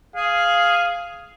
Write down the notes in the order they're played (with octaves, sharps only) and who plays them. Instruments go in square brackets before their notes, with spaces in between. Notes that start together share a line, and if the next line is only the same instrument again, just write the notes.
[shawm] G#4 [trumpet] F5